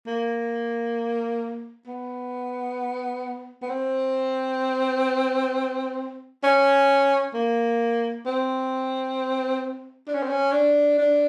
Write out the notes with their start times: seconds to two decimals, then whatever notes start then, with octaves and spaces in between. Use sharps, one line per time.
0.06 A#3
1.87 B3
3.62 B3
3.69 C4
6.43 C#4
7.34 A#3
8.26 C4
10.08 D4
10.14 C#4
10.22 C4
10.29 C#4
10.52 D4
10.98 D4